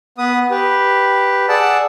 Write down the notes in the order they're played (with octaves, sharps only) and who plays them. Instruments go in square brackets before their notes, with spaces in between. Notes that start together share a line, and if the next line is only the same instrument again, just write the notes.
[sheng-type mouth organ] B3 B4 D#6
G4 B4
G#4 D5 F#5 A5 E6